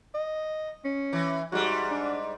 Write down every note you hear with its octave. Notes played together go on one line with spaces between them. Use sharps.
D#5
C#4
E3
G#2 G3 F#4
D4